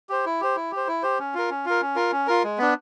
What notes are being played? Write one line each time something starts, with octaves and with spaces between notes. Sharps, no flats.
G4 C5
E4
G4 C5
E4
G4
C5
E4
G4 C5
C#4
F4 A#4
C#4
F4 A#4
C#4
F4 A#4
C#4
F4 A#4
G#3
B3 D4